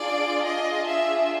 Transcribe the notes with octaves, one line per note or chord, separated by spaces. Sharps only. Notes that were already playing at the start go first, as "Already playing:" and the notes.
Already playing: D4 F4 G#4 D5
D#5
E5